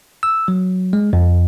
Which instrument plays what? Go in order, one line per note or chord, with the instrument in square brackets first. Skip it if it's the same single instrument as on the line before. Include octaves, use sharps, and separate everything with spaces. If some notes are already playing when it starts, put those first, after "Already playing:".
[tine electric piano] E6
F#3
G#3
F2